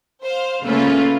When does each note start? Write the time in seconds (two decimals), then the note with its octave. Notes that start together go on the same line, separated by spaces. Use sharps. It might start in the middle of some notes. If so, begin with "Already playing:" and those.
0.22 C5 F5
0.65 C#3 A3 A#3 C#4 F4 B4